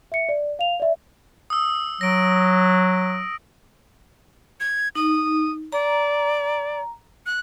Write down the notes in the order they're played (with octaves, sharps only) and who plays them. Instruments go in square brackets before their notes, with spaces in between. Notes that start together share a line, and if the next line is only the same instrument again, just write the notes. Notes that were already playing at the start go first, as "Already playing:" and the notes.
[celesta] E5 C#7
D5
F5 F7
D5 E5
[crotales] D#6 E6
[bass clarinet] F#3 [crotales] A#6 D7
[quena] G#6
[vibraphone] D#4 [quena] D#6
[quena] D5 [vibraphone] A#5
[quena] F#6